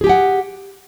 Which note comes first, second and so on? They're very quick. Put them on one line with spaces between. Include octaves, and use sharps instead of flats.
G#4 G4 G#5 F#5